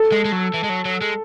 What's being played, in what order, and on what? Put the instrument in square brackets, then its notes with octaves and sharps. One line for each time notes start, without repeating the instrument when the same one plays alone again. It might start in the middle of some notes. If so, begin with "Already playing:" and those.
Already playing: [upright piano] A4
[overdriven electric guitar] G#3
G#3
F#3
E3
G#3
F#3
F#3
G#3